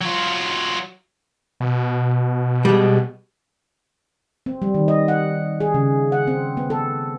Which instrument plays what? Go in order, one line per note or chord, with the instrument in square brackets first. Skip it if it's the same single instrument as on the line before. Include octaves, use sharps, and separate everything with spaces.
[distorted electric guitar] F#3 F4
[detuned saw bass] B2
[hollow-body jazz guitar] G3 G#3
[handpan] C4
G3
D#3
D#5
F#5
G#4
C#3
F#5
C4
B3
A4